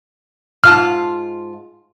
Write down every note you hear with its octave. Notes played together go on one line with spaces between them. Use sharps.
G#2 F4 A5 F6